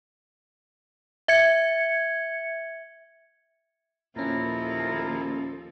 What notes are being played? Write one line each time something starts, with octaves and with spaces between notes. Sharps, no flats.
E5 G#6 C#7
D#2 A#2 F3 C#4 E4 A4 A#4